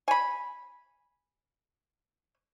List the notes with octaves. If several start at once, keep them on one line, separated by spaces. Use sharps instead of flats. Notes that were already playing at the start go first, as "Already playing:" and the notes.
G#5 B5